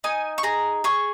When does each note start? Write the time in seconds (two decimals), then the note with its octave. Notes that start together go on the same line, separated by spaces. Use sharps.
0.04 D#4 G#5
0.38 C#6
0.43 G#4 A#5
0.84 G#4 C#6